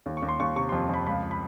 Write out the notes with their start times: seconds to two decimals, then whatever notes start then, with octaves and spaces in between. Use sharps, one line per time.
0.06 D#2
0.17 C#6
0.22 D#2
0.29 C6
0.40 D#2 C#6
0.56 C3 C#6
0.69 C6
0.72 F2
0.89 F2 B5
1.07 C#2 B5
1.31 B5